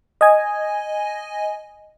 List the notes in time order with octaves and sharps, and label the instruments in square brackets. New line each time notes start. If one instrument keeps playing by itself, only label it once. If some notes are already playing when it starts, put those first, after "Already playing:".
[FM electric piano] D#5 G#5